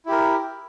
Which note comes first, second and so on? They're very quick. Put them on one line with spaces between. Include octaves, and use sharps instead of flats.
E4 G4 A#4